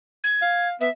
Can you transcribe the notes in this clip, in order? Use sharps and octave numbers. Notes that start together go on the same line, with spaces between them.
G#6
F5
B3 E5